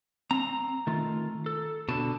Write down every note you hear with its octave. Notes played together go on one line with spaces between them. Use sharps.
C4 A#5
D#3 A3 F4
A4
B2 D3 A5